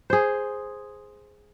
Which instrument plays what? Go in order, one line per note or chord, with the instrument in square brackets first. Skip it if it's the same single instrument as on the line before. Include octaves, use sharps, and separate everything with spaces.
[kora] G#4 C5